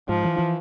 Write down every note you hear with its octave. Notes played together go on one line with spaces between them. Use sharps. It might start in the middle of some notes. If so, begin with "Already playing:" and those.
G#2 F3
E3
E3